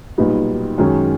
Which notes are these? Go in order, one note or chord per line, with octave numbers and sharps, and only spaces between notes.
B1 A#2 G3 B3 D#4
F#2 D#3 G#3 C#4